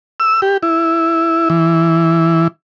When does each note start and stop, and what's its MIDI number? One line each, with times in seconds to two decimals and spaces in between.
0.20 0.41 88
0.42 0.57 67
0.63 1.49 64
1.50 2.48 52